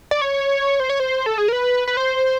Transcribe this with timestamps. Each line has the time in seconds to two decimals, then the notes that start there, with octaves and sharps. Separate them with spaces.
0.11 D5
0.21 C#5
0.80 C5
0.90 C#5
1.00 C5
1.26 A4
1.38 G#4
1.48 A#4
1.52 B4
1.88 B4
1.97 C5